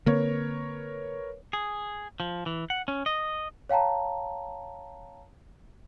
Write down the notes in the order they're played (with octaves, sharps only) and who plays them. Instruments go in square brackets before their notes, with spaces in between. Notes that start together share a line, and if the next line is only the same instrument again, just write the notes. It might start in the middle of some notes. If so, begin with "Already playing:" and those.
[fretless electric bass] D3 A#3 C4 [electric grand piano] A#4 B4 C#5
[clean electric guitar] G#4
F3
E3
F#5
C#4
D#5
[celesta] C#5 F5 G5 A5 A#5